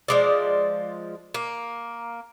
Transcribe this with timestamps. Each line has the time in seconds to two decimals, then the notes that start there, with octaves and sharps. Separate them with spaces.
0.08 F3 G#3 D5
1.34 A#3